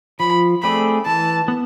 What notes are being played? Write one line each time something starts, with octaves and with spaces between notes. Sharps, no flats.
F3 B5
A3 C4 G#4 D5 B5
E3 A5
B3